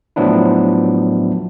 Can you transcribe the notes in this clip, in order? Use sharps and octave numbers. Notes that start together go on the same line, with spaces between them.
A2 F3 F#3 B3 D4 E4